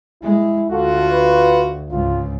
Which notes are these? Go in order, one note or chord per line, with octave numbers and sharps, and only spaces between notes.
G#3 E4
D2 F4 F#4 A4
B4
C#2 G#2 F4